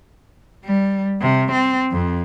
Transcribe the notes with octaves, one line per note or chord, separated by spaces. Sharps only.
G3
C3
C4
F2